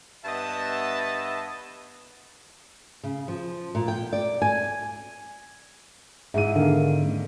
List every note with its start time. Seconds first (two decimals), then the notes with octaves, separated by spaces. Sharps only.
0.25 G2 B3 D#5 E5 A5
3.04 C#3
3.28 F3
3.75 A#2
3.88 G5
4.13 D5
4.42 G#5
6.34 G#2 E4 G#4 E5 D#7
6.56 D3 D#3 B3 D4 F5
7.03 A3 C#4